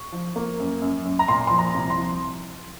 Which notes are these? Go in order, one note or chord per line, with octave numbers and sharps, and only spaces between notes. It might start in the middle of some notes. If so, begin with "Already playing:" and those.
Already playing: C#6
F3
A#3
F#2
F#2
F#2
A#5
A#2 C6
F3 C6
A#5
C2
C6
F3